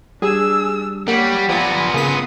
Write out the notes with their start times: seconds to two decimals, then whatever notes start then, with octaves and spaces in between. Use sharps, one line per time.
0.22 G3 D4 G#4 E6
1.08 G3 A#3 G4 C#5 F#5
1.49 F3 B3 F4 D5 G#5 A#5 B5
1.94 C#3 A#3 C6 D#6 B6